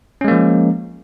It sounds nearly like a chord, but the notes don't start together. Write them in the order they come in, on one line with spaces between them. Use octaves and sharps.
C#4 G#3 A#3 F3